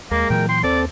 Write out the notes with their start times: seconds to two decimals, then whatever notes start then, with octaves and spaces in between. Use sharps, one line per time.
0.11 D#2 G#3 A#3 A#4
0.30 A#2 E3 F#3 G5
0.49 G5 C6
0.63 D#2 C4 A4 D5